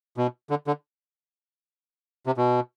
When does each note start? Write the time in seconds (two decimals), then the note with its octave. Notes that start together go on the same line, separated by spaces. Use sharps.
0.17 B2
0.50 D3
0.67 D3
2.26 C3
2.37 B2